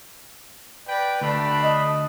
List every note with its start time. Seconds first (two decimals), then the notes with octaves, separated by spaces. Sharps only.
0.88 B4 D5 G5
1.21 D2 A3 D4 B5
1.63 D#5